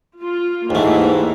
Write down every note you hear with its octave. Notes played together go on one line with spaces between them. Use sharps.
F4
D#2 G#2 E3 A3 A#3